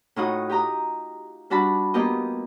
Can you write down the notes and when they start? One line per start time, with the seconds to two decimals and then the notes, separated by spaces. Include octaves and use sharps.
0.16 A2 D#4 F4 F#4 F#5 D#6
0.49 G4 D#5 A#5 D#6
1.50 G3 D4 F#4 A5 B5
1.94 A#3 B3 F4 G4 D#5